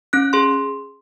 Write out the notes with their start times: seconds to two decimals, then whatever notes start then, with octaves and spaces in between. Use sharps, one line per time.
0.13 C#4 F#6
0.33 G#4 C6